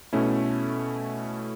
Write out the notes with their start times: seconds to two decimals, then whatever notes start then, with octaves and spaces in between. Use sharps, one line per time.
0.13 B2 A3 C#4 E4